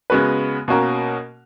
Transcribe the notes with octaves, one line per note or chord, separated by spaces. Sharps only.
C#3 G#3 B3 F#4 B4
B2 A#3 C#4 F#4 A#4